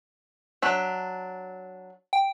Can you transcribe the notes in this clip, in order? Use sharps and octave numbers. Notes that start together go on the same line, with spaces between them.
F#3 D4 E5
G5